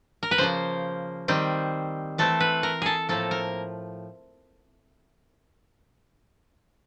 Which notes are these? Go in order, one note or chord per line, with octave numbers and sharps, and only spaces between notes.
A#4
B4
C#3 F3 A#3 C5
D#3 G3 C4
E3 A3 C4 A4
B4
A#4
G#4 A4
A2 F3 A#3 A4
A#4